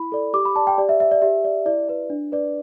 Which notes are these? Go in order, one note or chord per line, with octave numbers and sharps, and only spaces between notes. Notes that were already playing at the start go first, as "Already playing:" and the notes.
Already playing: E4 B5
A4 D5
G4 D6
B5
D5 A5
G5
G4 D5
E5
D5 E5
D5
G4 E5
D5
E4 D5
B4 D5
D4
B4 D5